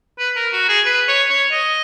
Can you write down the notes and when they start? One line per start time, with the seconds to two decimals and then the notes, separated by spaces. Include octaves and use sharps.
0.19 B4
0.36 A#4
0.53 F#4
0.69 G#4
0.86 B4
1.08 C#5
1.30 C#5
1.52 D#5